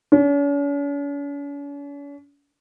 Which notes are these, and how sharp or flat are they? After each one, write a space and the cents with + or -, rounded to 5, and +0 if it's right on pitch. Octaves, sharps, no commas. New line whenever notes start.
C#4 +45